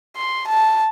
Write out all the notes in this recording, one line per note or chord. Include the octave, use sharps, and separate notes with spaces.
C6
A5